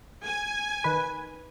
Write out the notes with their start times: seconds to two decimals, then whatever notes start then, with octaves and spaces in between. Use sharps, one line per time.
0.23 G#5
0.84 D#3 B4